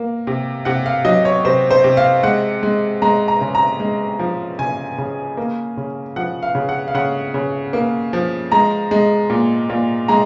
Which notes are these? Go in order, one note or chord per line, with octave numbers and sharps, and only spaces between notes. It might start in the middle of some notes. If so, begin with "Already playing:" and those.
Already playing: A#3
C3
C3 F#5
F5
F#3 D#5
C#5
C3 C5
C5
C3
F5
G#3 F#5
G#3
G#3 A#5
A#5
C#3
A#5
G#3
F3
C#3 G#5
C#3
A#3
C#3
F3 F#5
F5
C#3
F#5
F5
C#3 F#5
C#3
A#3
F3
G#3 A#5
G#3
A#2
A#2
G#3 A#5